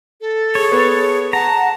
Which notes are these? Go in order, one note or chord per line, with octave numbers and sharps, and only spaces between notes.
A4
G#4 C#5
B3
F#5 A5 A#5